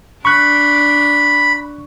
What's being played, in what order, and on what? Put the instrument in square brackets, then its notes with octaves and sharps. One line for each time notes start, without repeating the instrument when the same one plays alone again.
[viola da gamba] D4 [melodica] B5 [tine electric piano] C#6 F#6